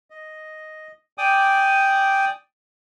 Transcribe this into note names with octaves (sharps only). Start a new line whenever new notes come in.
D#5
D5 G5 G#5 D6 D#6